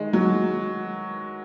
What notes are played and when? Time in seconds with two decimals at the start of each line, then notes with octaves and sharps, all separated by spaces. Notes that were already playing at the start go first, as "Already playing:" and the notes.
Already playing: D#3 G#3
0.13 F#3